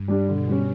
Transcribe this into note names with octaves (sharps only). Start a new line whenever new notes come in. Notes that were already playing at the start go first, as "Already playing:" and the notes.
Already playing: G2
G3 D4 G4
B2 D3
G3 C#4